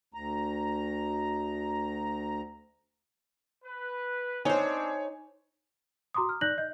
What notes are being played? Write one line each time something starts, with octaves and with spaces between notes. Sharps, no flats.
D2 A#5
B4
C4 D4 D#4 C5 C#5 G#5
F#4 A#5 C6 D6 D#6
F6
D#4 D5 F#6 G6 A#6 F#7
D#5 G6